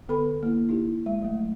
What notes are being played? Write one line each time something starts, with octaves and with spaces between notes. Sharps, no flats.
D3 B3 A4 B4 B5
A#3 E4
D#4 E4 G4
G#3
F#3 A3